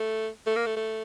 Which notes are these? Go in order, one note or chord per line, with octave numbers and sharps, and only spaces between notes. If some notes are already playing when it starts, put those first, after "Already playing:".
Already playing: A3
A3
A#3
A3
A3